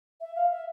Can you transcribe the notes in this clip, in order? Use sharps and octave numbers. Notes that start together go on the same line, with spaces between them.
E5
F5
E5